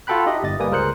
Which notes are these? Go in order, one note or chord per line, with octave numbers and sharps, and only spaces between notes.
F4 F#4 A4 G5 B5 F#6
D#4 G4 D#5 E5
G1 D#5 A6
G3 A#3 B4 G#5 D#6
C#2 G#4 A#4 C5 F#6 C#7